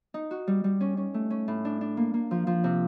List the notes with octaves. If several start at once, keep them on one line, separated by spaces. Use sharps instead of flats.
D#4
F#4
G3
G3
C#4
C#4
A3
C#4
A2
D4
D4
A#3
A#3
F3
F3
C3